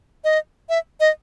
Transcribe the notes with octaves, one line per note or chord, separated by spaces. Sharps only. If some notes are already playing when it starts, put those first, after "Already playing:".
D#5
E5
D#5